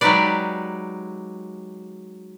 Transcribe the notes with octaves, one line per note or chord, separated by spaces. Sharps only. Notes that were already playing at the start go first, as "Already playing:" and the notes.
F#3 G#3 D#4 G4 B4 D5